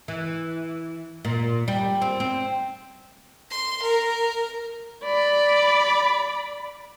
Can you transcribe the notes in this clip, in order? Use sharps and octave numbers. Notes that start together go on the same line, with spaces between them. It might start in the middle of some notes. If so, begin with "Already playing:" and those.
E3
A#2
G3
C4
C4
C6
A#4
D5 B5